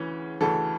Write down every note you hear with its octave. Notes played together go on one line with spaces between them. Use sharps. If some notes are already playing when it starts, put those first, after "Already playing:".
Already playing: D2 C#3 E3 C#4
D2 C#3 E3 A4